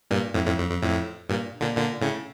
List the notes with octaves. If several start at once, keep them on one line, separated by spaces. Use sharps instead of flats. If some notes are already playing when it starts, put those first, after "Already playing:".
G2 A#2
F2 A2
F2 A2
F2
F2
F2 A2
G2 A#2
A#2 D3
A#2 D3
A2 C#3